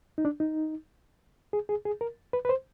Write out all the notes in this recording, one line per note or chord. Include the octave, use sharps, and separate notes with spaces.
D#4
D4
D#4
G#4
G#4
G#4
A#4
B4
B4
C5